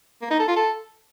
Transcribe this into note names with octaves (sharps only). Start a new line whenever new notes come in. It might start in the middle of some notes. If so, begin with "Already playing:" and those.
A#3
D#4
A4
F4
A4